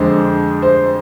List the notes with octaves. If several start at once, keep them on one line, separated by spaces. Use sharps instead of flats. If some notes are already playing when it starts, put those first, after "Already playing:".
Already playing: F2 D3 G#3 D4 C5
C5